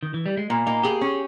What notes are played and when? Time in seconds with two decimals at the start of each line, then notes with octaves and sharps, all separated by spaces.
0.03 D#3
0.14 E3
0.26 G3
0.37 G#3
0.50 A#2 A#3
0.67 A#3 D#4
0.83 G4 G#4
1.01 C#4